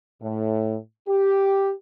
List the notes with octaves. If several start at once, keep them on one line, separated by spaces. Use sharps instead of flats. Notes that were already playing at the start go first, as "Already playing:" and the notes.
A2
G4